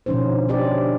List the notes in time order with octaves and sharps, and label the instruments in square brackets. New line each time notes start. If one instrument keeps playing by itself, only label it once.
[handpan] B2 D3 F3 C#4 D#4 C5
C#4 D4 G4 C5 D5 D#5